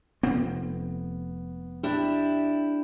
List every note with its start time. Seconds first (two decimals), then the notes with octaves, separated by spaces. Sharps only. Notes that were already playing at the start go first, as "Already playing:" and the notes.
0.23 F1 B3 C4
1.83 D4 E4 G4